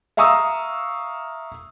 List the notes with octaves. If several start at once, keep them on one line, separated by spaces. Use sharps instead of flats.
E5 F5 A#5 C#6 D#6 E6